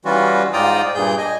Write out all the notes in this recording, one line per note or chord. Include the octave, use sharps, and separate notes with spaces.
E3 G3 C#4 F4 F#4
G#2 F4 D5 G5 A#5 D#6
G2 A#2 G#4 G6
D#5 G#5